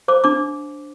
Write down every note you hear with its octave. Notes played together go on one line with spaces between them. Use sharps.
C5 D6
D4 D6